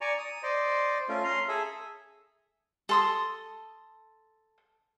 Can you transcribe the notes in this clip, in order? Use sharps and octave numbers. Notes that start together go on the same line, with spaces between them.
D5 G#5 A#5 C#6
D#6
C5 D5 D#5
A3 C#4 F4
C#4 A#5 C6
G#4 A4 E5
A4 C6 D#6